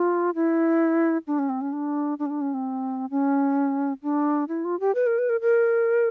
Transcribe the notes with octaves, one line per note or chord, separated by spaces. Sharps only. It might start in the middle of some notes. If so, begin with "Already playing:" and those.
Already playing: F4
E4
D4
C#4
C4
C#4
D4
D4
C#4
D4
C#4
C4
C#4
D4
E4
F4
G4
B4
A#4
B4
A#4
A#4